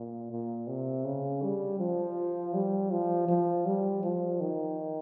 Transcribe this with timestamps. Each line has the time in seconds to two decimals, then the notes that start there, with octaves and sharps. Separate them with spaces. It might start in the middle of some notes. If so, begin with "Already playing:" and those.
Already playing: A#2
0.31 A#2
0.67 C3
1.05 C#3
1.42 G3
1.80 F3
2.54 G3
2.91 F3
3.28 F3
3.66 G3
4.03 F3
4.40 D#3